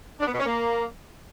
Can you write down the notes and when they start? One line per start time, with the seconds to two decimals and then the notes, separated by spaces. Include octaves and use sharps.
0.20 D4
0.27 B3
0.33 B2
0.39 C#4
0.46 A#3